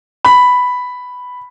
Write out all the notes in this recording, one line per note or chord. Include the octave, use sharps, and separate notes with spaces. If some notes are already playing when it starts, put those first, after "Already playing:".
B5